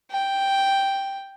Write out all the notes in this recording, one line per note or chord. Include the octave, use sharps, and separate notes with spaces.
G5